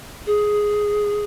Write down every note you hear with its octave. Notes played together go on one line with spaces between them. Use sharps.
G#4